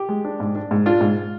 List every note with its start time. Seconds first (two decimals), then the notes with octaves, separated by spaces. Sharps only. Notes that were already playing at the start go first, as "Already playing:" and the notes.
Already playing: G4
0.09 G#3
0.25 D4
0.40 G#2
0.56 D4
0.71 G#2
0.86 D4 F4
1.01 G#2